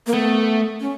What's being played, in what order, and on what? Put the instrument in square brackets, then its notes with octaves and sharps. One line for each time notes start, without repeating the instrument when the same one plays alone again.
[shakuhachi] A#3
[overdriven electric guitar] A3 [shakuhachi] B3
[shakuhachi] C#4